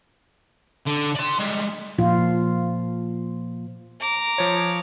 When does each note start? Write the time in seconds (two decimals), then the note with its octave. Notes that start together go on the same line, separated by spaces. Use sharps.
0.86 D3
1.15 D5 C6
1.39 G3 G#3
1.98 A#2 F3 F4
4.00 A#5 D6
4.38 F3 C#5